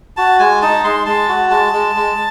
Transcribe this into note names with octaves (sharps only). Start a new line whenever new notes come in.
F#4 A5
G#3 G#5
D#4 A5
G#3 C6
G#3 A5
F#4
G#3 A5
G#3
G#3